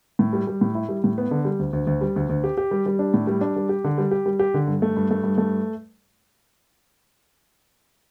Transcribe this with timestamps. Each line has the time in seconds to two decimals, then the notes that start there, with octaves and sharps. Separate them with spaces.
0.19 A2
0.33 G3
0.47 G3
0.61 A2
0.75 E4
0.89 G3
1.04 A2
1.18 B3
1.31 D3
1.45 G3
1.59 D2
1.73 D2
1.87 D2
2.01 G3
2.16 D2
2.29 D2
2.44 G4
2.57 G4
2.71 G3
2.86 G3
2.99 D4
3.14 A2
3.27 G3
3.41 D4
3.56 G3
3.69 G4
3.84 D3
3.98 G3
4.11 G4
4.26 G3
4.39 G4
4.54 D3
4.67 G2
4.82 A3
4.96 G2
5.11 A3
5.23 G2
5.38 A3